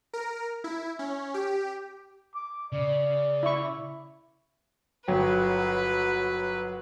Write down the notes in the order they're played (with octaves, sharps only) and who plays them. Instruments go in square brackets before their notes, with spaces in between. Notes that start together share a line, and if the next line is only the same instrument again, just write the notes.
[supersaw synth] A#4
E4
C#4
G4
[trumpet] D6
[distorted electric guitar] C#3 [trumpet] D5
[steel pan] E4 C#6
[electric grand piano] G1 F#3 G5 [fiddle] B4